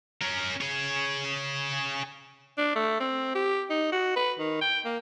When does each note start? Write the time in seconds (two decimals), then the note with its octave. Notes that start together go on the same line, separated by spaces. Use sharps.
0.22 C#4 A#4
0.61 G#4 C#5
2.58 D4
2.76 A3
3.00 C4
3.35 G4
3.70 D#4
3.92 F#4
4.16 B4
4.39 D#3
4.61 G5
4.85 A#3